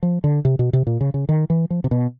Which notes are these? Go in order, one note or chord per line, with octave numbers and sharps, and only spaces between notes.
F3
D3
C3
B2
C3
A#2
C#3
C#3
D#3
E3
F3
C3
B2